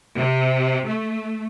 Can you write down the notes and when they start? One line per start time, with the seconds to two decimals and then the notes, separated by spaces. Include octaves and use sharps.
0.17 C3
0.85 A3